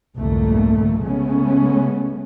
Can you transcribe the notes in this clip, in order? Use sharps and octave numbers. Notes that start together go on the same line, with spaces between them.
C2 F2 G#2 D3 A3 A#3
C#3 G#3 A3 B3 C#4